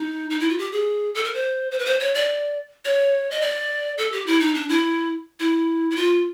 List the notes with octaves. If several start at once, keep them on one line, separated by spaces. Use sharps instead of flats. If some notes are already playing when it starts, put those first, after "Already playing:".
Already playing: D#4
D#4
E4
F4
G4
G#4
A4
A#4
C5
C5
B4
C5
C#5
D5
C#5
D#5
D5
A4
G4
E4
D#4
D4
E4
E4
E4
F4